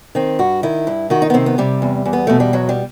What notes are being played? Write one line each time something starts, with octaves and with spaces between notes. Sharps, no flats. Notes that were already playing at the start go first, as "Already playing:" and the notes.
D#3 C4
G2 F#4
D#3 E4
G2
D#3 F#4
D#4
B3
C3 C4
B3
C3 G3
E2
E2
B3
B2 A3
G3
E2 F#3
G3